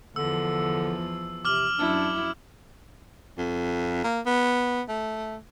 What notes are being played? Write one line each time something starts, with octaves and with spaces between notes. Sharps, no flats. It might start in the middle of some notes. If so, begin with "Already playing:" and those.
E2 D3 F3 E6
C3 D6 F6 F#7
F#2 F#3 D4 E4
F2
A#3
B3
A3